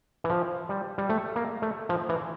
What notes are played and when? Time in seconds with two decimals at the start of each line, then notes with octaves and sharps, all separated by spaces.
0.24 E3
0.30 F3
0.69 G3
0.98 G3
1.09 A3
1.36 A#3
1.62 A3
1.89 F3
2.09 E3